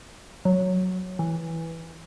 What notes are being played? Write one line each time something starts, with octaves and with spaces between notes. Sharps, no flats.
F#3
E3